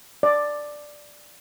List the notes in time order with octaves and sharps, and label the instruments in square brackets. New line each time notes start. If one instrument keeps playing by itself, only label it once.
[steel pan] D5